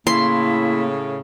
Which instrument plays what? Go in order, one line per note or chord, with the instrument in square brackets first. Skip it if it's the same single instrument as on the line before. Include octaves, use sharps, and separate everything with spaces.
[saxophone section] A2 C#3 [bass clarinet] A#3 [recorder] E4 [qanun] C6